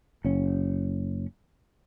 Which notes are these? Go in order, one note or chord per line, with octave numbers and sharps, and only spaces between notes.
F#1 C#4